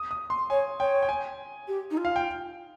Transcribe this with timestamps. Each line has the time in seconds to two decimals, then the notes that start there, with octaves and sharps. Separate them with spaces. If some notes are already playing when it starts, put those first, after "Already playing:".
Already playing: D#6
0.11 D#6
0.30 C6
0.50 C#5 G#5
0.80 C#5 G5
1.03 G5
1.09 G#5
1.68 G4
1.90 D#4
1.97 F4
2.05 F5
2.16 G5